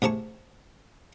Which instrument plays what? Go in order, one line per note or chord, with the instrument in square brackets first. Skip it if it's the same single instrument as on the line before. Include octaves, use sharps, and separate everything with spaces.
[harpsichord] A2 C3 G#4 A5 C#6